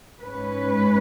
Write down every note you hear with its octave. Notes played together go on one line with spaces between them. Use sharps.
G#2 G#3 C#4 B4